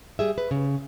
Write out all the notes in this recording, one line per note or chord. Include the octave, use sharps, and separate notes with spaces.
G3 G#4 E5
B4
C#3